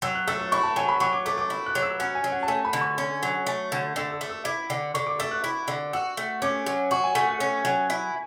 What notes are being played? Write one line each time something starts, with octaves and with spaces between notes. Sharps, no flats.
F#3 E6
F#6
A3 E6
E6
E4 C#6
A5
F#3 G#5
B5
F#3 C#6
D6
A3 D6
D6
E4
F#6
F#3
E6
C#4 F#5
G#5
F#3
F#5
A5
A3 G#5
B5
D3
C#6
C#4
F#3
A3
D3
D3 E6
E6
A3
E6
E4 D6
D3
D3 C#6
D6
A3 E6
F#6
E4
D3
F#4 E6
A3
C#4 D6
F#3
F#4 C#6
G#5
A3 G#5
F#5
C#4
F#3
E4